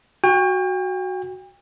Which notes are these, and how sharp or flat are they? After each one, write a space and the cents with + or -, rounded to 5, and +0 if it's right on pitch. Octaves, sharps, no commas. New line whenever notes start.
F#4 +0 G5 +40